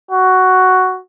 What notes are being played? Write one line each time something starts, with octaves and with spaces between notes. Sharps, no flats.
F#4